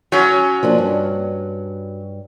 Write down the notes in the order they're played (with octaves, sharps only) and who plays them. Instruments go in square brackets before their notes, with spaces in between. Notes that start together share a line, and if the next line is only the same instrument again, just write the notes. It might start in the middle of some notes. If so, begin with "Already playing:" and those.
[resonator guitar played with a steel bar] F#3 C#4
[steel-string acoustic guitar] F3 A#3 D4
G2